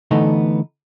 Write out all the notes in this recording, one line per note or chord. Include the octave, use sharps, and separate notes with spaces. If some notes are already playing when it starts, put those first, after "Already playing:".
D3 E3 A3 B3 D#4